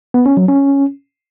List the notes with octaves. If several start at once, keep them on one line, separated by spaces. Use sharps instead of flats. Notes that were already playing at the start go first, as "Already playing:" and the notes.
B3
C#4
F#3
C#4